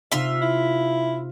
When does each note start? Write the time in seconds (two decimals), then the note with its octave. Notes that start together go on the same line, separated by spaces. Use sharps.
0.12 C3 D#4 F4 E5 F5
0.42 E4